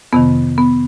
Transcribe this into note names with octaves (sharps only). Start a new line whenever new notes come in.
F2 C3 D#3 B3
B3